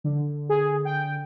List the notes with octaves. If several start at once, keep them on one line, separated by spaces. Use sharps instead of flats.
D3
G#4
G5